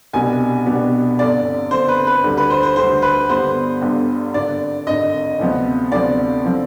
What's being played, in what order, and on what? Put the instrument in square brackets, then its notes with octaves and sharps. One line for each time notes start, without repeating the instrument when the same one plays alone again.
[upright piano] C2 B2 B3 D4 G4 [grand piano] G#5
[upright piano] C2 B2 B3 D4 G4
[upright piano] G1 F2 D3 [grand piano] D5
[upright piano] G1 F2 D3 [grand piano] C5
[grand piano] B4
B4
[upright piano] D2 D3 G3
[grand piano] B4
C5
C5
[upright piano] D2 D3 G3 [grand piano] C5
[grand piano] B4
[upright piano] G1 G2 D3 G3 B3 [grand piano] C5
[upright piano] G1 G2 D3 G3 B3
[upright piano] G#1 G2 D3 [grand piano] D5
[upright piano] G#1 G2 D3 [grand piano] D#5
[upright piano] D2 C3 F3 B3
[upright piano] D2 C3 F3 B3 [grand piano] D5
[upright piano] D3 F3 C4